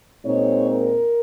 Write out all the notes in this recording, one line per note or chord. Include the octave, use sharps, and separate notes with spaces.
A#2 G#3 C4 D#4 C#5
A#4